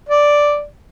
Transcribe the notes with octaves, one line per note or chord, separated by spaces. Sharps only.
D5